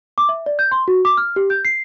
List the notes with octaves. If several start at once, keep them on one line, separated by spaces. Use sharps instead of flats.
D6
E5
D5
G6
C6
F#4
D6
F6
G4
G6
C7